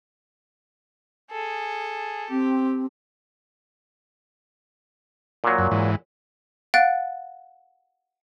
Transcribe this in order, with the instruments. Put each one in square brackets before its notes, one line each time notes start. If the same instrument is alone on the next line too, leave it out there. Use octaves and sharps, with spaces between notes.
[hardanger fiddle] G#4 A4
[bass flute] C4 [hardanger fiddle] G4
[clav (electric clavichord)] A#2 F#3
[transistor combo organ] F#2
G#2 E3
[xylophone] F5 F#5 F#6 A6 D7